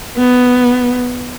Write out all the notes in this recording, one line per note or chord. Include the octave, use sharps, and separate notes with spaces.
B3